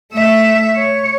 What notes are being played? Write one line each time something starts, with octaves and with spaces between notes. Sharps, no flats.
A3 E5
C#5